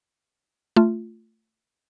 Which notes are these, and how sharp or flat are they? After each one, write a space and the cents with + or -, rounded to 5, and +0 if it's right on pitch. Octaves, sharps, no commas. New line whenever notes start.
A3 +15 F4 -5